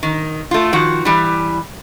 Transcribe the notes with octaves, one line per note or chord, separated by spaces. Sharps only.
D#3
A3 F4
D#3 F3 F#4
E3 G3